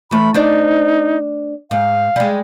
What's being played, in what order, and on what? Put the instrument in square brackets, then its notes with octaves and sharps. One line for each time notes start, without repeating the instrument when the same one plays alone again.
[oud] E3 A3 [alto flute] B5
[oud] D4 C5 D5 [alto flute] D#4
[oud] G#2 [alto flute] F5
[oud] G3 G#3